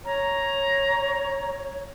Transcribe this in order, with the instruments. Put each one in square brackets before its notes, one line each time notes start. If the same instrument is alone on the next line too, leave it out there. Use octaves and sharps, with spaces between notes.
[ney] C#5 [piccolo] A#5